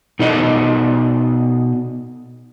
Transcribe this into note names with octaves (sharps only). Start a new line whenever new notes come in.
B2 D#4 A4 D5 D#5